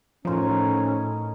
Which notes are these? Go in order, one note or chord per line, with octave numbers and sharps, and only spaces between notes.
A2 F3 C#4 D#4 A#4 C5